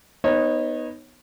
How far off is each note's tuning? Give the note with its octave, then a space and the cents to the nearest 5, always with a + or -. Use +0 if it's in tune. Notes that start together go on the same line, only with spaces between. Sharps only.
B3 +0 D#4 +0 C#5 -30